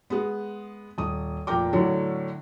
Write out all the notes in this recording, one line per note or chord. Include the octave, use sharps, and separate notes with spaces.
G#3 B3
D#1 D#6
F1 A#2 A#4 G5 D6
A2 D3 F#3